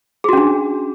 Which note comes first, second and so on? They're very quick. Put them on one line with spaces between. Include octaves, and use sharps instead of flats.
G#4 F#4 C#4 D4